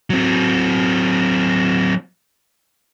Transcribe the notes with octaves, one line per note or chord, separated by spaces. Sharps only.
F#3 C4